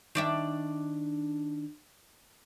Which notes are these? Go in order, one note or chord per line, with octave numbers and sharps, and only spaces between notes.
D#3 D4 E5